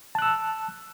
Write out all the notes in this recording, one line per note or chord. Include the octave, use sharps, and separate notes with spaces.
A5 E6 F#6